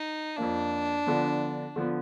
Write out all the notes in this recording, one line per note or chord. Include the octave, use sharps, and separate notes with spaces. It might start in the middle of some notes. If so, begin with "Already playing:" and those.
Already playing: D#4
F2 F3 A#3 D4
D3 F3 B3
D3 F3 B3